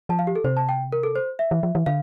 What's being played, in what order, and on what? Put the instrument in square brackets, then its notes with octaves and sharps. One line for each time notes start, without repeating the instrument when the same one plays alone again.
[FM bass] F3 [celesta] A5
[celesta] F5
G4
A4
[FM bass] C3 [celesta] C5
[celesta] A5
G5
A#4
A4
C5
E5
[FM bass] E3
F3
E3
[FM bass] D3 [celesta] F5